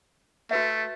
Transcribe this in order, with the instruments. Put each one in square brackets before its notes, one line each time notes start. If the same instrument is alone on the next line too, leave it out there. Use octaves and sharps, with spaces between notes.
[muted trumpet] A3 [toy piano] F#4 B4 E5